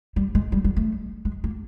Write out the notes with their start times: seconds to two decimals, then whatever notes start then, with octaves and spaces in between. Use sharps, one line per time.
0.16 G3
0.35 G#3
0.52 G3
0.64 G3
0.77 A3
1.25 G#3
1.44 A#3